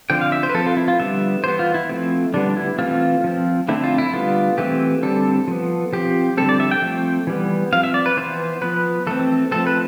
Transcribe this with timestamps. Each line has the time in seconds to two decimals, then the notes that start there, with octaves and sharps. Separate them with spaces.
0.10 D3 F3 C4 G5
0.21 F5
0.32 E5
0.43 C5
0.50 B4
0.54 F3 C4 A4
0.66 F4
0.77 E4
0.88 F4
0.99 D3 G3 B3 E5
1.44 E3 B3 C5
1.59 F4
1.74 E4
1.89 F3 A3 C4
2.34 D3 G3 B3 D4
2.57 E4
2.78 E3 A3 C4 F4
3.24 F3 C4
3.68 D3 A3 C4 E4
3.84 F4
3.98 E4
4.13 D3 G3 B3 F4
4.58 E3 A3 C4 G4
5.03 D3 G3 C4 A4
5.48 F3 B3
5.93 F3 C4 G4
6.37 D3 G3 C4 A4
6.49 D5
6.60 E5
6.71 G5
6.82 F3 A3 C4
7.27 E3 G3 B3
7.72 F3 C4 F5
7.84 E5
7.94 D5
8.06 B4
8.17 E3 B3 C5
8.62 F3 B3 B4
9.07 E3 A3 C4 A4
9.51 F3 A3 C4 A4
9.67 B4